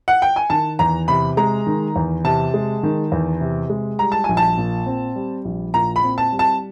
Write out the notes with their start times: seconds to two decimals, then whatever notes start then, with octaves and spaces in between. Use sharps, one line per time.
0.08 F#5
0.22 G5
0.36 G#5
0.50 D#3 A5
0.79 E2 A#5
1.08 C3 B5
1.37 G#3 A#5
1.67 D#3
1.96 E2
2.24 C3 A5
2.54 G#3
2.83 D#3
3.12 E2
3.41 C3
3.70 G#3
3.99 G3 A#5
4.12 A5
4.24 A#1 G#5
4.37 A5
4.57 A#2
4.86 C4
5.16 G3
5.45 A#1
5.74 A#2 A#5
5.96 B5
6.03 C4
6.18 A5
6.32 G3
6.39 A5